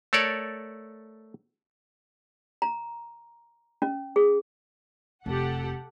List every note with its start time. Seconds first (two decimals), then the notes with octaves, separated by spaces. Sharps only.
0.13 A3 A4 A#4 C#5 D5
2.62 A#5
3.82 C#4
4.16 G#4
5.26 F1 G4 A4 F#5